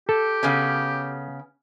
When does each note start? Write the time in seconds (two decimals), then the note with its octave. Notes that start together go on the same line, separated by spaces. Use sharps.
0.09 G4 A4
0.43 C#3 B3 C#4